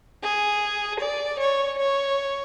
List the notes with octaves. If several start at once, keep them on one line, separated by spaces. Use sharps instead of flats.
G#4
D5
C#5
C#5